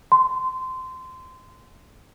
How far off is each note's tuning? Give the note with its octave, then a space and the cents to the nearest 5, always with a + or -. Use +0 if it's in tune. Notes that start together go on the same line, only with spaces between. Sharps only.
C6 -20